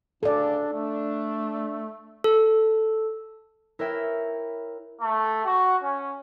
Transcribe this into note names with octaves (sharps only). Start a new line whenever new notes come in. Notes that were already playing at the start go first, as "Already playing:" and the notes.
D2 C#3 D4 A4 D5
A3 D4
A4
E4 A#4 B4 C#5 E5 G5
A3
F#4
C#4